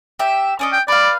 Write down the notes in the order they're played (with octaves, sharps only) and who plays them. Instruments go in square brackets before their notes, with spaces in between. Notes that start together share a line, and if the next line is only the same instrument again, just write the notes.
[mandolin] G4 E5
C#4 D4 D#5
[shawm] G5
[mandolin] B4 F5 [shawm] D5